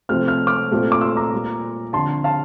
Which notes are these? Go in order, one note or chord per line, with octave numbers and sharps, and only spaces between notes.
C3 F3 A3 C4 F6
F6
D6 F6
A#2 A3 C4
D6
C6 E6
A#5 D6
A#2 G3 A#3
D3 F3 C4 A5 C6
F5 A5